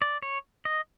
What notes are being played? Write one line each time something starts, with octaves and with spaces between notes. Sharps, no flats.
D5
C#5
D#5